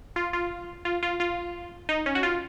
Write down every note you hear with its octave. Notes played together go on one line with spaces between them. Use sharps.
F4
F4
F4
F4
F4
D#4
C#4
F#4
F4